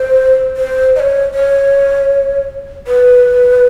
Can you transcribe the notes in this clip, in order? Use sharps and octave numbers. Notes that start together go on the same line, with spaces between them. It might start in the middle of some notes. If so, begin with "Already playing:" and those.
Already playing: C5
C5
D#5
C#5
C#5
B4